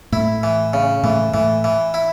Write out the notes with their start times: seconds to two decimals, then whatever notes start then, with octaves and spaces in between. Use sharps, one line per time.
0.12 A2 A3 E4
0.43 E3
0.73 C#3
1.03 A2 E3 A3
1.34 A2 E3 A3
1.64 E3
1.94 E4